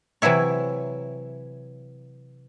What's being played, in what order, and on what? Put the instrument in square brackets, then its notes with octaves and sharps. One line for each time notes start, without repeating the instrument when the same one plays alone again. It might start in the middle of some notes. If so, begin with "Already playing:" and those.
[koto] C3 E3 F#3 E4 C#5